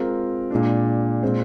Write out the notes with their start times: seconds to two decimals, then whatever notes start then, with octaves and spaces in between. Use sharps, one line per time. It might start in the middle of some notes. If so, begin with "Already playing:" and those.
Already playing: G#3 C4 F4 A#4
0.51 A#2 G#3 D4
1.23 A#2 G#3 C4